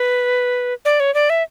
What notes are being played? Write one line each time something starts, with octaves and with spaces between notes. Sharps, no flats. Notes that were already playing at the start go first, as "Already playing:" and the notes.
Already playing: B4
D5
C#5
D5
E5